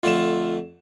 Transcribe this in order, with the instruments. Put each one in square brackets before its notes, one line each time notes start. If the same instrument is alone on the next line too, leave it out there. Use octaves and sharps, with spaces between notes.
[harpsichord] F2 D3 A3 [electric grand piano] F4 E7